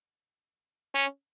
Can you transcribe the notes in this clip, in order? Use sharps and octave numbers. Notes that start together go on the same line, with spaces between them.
C#4